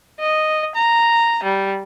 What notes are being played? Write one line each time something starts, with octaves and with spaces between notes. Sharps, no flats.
D#5
A#5
G3